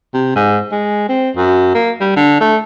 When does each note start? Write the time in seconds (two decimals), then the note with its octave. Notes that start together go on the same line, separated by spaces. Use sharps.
0.14 C3
0.36 G#2
0.71 G#3
1.09 C4
1.36 F#2
1.75 A#3
2.00 G3
2.16 D3
2.40 A3